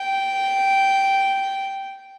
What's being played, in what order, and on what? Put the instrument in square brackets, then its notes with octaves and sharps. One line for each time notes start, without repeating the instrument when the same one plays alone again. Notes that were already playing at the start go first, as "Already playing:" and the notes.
Already playing: [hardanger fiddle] G5